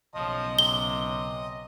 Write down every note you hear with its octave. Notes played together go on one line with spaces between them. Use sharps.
B1 C#3 F3 D#5
C3 G7